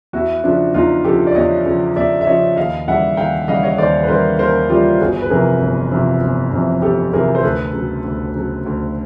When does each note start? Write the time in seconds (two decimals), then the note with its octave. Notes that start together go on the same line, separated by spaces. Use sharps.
0.13 E2 E4 F#4
0.44 C#3 F3 D4 E4
0.74 E2 D#4 F4
1.04 C#3 F3 G4 A4
1.27 D5
1.35 E2 C#5 D#5
1.65 C#3 F3
1.96 E2 D5 E5
2.21 E5
2.26 C#3 F3 C#5 D#5
2.56 D#2 D#5 F5
2.88 C#3 E3 G3 E5 F#5
3.17 D#2 F5 G5
3.48 C#3 E3 G3 D#5 F5
3.63 C#5 D#5
3.78 D#2 C5 D5
4.03 B4
4.08 C#3 E3 G3 A#4 C5
4.39 D#2 A#4 C5
4.69 C#3 E3 G3 F4 G4
5.00 G1 F#4 G#4
5.22 B4
5.30 F2 C3 E3 G#4 A#4
5.61 G1
5.91 F2 C3 E3
6.22 G1
6.52 F2 C3 E3
6.82 G1 G4 A4
7.13 F2 C3 E3 G#4 A#4
7.35 C5
7.43 D2 A4 B4
7.73 C#3 F#3
8.04 D2
8.35 C#3 F#3
8.65 D2